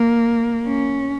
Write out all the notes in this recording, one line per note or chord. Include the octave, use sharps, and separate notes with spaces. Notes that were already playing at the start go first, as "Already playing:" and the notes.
Already playing: A#3
C#4